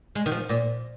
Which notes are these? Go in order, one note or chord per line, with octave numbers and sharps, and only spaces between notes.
G#3
D#3
F3
A#2